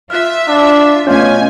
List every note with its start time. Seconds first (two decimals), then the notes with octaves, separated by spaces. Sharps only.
0.10 F4 E5 F6 F#6
0.48 D4
1.07 B2 A3 C#4 F4 D#5 G#5 G6